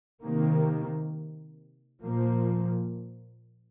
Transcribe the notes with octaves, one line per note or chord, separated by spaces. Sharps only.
C3 D#3 A#3
A#2 F3 A#3